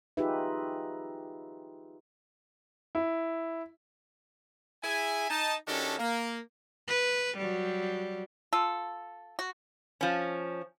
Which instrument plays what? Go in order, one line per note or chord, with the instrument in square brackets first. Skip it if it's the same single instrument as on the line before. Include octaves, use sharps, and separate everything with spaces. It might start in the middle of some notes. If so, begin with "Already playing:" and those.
[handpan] D#4 F4 G4 G#4 B4 E5
[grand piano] E4
[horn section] E4 G#4 E5 G#5
D#4 A5
D#3 C#4 D4 F#4 G4 A4
A#3
[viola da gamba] B4
F#3 G3
[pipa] F4 A4
F#4
[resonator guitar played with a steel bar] F3 C#4